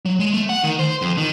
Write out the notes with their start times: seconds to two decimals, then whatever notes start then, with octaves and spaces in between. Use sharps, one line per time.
0.06 F#3
0.20 G#3
0.33 A3
0.49 F#5
0.63 D#3
0.79 C5
1.02 F2
1.17 D#3